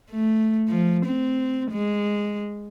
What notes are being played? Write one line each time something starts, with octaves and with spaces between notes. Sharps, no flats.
A3
F3
C4
G#3